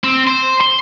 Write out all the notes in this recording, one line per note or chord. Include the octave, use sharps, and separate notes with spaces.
C4
C5
C6